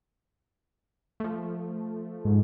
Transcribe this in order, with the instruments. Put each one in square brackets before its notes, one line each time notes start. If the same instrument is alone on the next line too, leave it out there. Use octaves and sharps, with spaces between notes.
[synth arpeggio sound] F3 A3
[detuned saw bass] G#2